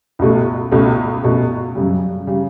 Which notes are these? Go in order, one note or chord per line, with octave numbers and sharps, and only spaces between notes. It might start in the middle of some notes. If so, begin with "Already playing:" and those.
C#2 B2 A3
C#2 B2 A3
C#2 B2 A3
F#2 C#3 G3
C#3 G3